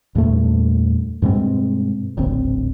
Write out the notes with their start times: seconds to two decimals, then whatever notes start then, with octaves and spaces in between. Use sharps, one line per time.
0.15 E2 G2 A#2 A3
1.22 G2 B2 G#3 C4
2.17 D#1 A1 D2 C4